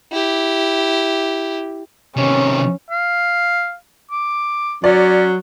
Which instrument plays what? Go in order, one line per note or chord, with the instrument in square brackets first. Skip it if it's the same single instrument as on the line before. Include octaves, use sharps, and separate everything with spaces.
[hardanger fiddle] E4 G4
[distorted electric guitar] C3 D#3 [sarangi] C#4
[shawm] F5
D6
[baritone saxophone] F#3 [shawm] C#4 [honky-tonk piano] D5